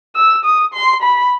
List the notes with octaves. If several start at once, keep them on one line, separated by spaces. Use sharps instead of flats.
E6
D#6
C6
B5